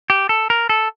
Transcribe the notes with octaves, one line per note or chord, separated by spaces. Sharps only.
G4
A4
A#4
A4